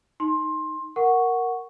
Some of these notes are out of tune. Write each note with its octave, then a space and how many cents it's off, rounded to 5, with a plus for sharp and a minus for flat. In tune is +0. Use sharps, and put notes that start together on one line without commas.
D#4 +0 C6 +20
A#4 +0 F#5 +0 C#6 +0